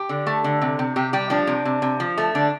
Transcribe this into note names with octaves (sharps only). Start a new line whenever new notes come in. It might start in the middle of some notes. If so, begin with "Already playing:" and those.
Already playing: G4
D3
A3
D3
C3
C3
C3 G4
G3 G4
F3 D4
C3
C3
C3
F3
A3
D3 D4